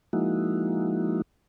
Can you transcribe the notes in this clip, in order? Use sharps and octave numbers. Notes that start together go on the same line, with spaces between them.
F3 G#3 A#3 D#4 E4 F#4